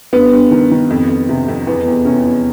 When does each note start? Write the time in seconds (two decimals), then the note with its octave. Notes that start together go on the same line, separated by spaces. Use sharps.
0.13 G2 B3
0.33 G2
0.51 D#3
0.71 D#3
0.90 F2
1.09 F2
1.29 C3
1.48 F2
1.67 E2 B3
1.86 E2
2.05 C3 C#4
2.25 E2